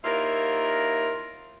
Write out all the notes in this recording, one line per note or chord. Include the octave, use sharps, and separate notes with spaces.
D#2 E4 F4 A#4